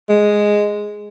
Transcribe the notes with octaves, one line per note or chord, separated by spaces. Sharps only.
G#3